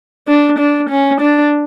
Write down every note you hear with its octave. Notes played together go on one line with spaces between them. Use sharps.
D4
D4
C#4
D4